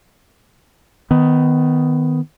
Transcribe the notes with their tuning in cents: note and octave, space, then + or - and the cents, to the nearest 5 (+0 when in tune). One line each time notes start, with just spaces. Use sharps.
D#3 +0 B3 +15